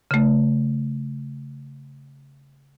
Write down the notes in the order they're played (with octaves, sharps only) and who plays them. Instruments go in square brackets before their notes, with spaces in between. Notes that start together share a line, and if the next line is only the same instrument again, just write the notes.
[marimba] C#3 A3